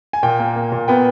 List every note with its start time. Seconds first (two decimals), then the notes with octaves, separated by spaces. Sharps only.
0.13 G#5
0.23 A#2 G5
0.39 A#3
0.56 A#3
0.72 A#2
0.88 B3 G5